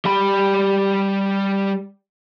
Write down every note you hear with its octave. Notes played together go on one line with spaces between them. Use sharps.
G3 B5